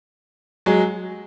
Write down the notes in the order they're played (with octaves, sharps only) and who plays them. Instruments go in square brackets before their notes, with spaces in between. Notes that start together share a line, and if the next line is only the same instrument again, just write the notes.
[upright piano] F#3 G#3